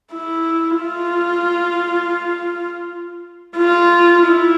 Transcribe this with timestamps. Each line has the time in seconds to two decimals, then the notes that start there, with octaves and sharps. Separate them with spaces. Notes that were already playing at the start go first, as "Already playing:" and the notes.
0.13 E4
0.82 F4
3.57 F4
4.27 E4